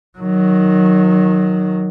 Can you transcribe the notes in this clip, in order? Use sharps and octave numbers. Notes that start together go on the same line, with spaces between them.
D#3 F#3